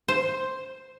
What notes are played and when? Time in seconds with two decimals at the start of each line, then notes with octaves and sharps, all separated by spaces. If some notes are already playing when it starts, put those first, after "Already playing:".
0.08 C5